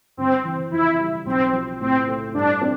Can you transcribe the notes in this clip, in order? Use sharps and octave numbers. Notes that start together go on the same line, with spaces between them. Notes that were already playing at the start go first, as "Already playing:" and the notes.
G1 C4
E3
F2 E4
G3
B1 C4
F3
A2 C4
A3
G2 D4
C4